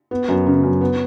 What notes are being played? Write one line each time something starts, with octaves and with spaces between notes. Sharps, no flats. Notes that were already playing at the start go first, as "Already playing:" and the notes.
B3
F#2
C#3
F#2
B3